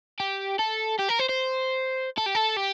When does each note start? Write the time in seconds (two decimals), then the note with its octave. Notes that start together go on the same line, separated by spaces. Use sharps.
0.20 G4
0.59 A4
0.99 G4
1.09 A#4
1.19 C5
1.29 C5
2.18 A4
2.26 G4
2.35 A4
2.57 G4